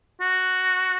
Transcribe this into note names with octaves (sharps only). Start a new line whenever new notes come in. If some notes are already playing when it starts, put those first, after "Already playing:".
F#4